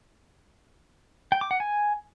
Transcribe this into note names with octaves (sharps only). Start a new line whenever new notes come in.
G5
D6
F#5
G#5